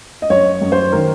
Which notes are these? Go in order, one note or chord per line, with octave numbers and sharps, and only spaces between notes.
D#5
F#2 C#5
F#2
C5
D#3 A#4